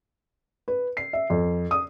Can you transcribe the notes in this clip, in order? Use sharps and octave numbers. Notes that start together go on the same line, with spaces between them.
B4
C7
E5
F2
D#6